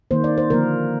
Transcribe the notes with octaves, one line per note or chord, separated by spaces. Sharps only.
D#3 A#3 C5
D5
C5
D3 F3 A#3 A#4